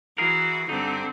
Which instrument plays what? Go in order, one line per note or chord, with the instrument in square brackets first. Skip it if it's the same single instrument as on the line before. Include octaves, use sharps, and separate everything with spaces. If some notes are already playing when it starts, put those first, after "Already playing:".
[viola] E3 F#4 [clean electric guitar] E4 G#4 A#4
[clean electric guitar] G2 D#4 [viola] D3 C4